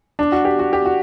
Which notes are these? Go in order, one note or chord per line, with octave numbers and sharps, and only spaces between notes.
D4
F#4
G4
F#4
G4
F#4